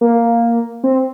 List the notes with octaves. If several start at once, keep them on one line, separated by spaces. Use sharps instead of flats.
A#3
C4